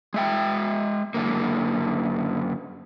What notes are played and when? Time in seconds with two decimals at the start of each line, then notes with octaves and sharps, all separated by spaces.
0.14 G#3 E5 G5
1.14 F#2 D3 A#3